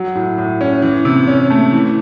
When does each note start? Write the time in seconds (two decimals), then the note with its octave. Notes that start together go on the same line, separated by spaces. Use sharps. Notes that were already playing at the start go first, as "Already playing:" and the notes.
Already playing: F#3
0.15 A2
0.38 A2
0.61 C#4
0.82 E3
1.05 C3
1.27 C#4
1.50 A3
1.72 E3